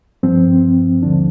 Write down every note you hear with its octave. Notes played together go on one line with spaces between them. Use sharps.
G2 F3 C4
D#2 D3 F3 D4